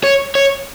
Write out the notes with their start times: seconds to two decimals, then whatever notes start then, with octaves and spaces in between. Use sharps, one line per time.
0.04 C#5
0.35 C#5